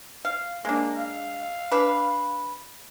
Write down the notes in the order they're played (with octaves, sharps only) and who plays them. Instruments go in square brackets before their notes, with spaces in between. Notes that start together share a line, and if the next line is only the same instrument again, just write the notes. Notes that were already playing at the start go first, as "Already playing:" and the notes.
[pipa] F5
[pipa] G#3 D4 [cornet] A#3
[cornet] F5
[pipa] D4 B4